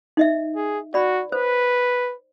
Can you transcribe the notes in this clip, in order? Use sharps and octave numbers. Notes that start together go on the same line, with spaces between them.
D#4 D#5 E5
G#4
F#4 D5 B5
B4 C5